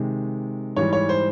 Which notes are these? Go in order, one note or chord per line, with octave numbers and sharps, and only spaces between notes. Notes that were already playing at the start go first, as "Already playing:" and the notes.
Already playing: C3 D#3 G#3
G#2 E3 G3 C#5
C#5
C5